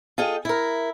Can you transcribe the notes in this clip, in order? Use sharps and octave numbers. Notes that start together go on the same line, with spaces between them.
F4 G#4 A4 D#5 G5
E4 A#4